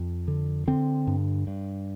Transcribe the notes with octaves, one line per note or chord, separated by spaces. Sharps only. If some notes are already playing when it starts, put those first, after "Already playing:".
Already playing: F2
D3
D3 C4
G2
G2